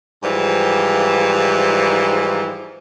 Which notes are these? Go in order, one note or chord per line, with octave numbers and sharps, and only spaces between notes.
G#2 E3 F3 G3